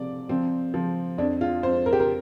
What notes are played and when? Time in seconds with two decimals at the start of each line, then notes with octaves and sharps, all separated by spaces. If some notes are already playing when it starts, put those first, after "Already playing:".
Already playing: C3 F3 D5
0.29 F3 C4
0.74 F3
1.18 F2 D4
1.41 F4
1.63 F2 C5
1.86 A#4
1.93 G4
2.00 A#4